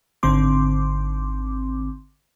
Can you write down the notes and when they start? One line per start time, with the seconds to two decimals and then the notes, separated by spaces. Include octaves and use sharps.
0.23 G#1 D3 C4 C6 D6